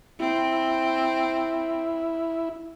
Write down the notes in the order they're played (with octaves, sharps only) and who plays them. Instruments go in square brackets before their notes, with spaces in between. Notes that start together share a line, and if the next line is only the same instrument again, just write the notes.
[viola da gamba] C4 [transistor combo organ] E4